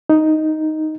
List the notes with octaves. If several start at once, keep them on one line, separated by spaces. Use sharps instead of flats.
D#4